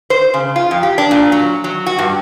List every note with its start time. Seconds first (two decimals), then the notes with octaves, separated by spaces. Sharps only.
0.10 C5
0.34 C#3
0.56 F4
0.71 F2
0.83 G4
0.98 D4
1.11 A#2
1.32 F#3
1.64 F#3
1.86 F#4
1.99 G2